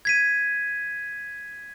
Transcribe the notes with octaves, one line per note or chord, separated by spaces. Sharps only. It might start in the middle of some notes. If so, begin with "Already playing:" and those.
G#6 B6 D#7